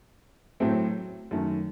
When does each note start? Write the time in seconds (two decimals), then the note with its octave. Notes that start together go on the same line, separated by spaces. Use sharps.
0.60 A2 F#3 A3 C4
1.31 F#2 D#3 A3